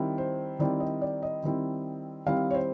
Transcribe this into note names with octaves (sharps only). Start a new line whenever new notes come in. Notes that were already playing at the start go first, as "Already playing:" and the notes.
Already playing: D#3 G3 C4 E4
C5
D#3 G3 C4 E4 D5
D#5
D5
D#5
D#3 G3 C4 E4
D#3 G3 C4 E4 F5
C#5
C5